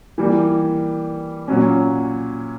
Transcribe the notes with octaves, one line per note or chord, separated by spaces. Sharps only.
E3 G3 A#3
A#2 F#3 C#4